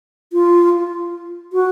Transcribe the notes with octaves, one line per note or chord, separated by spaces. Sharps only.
F4
F#4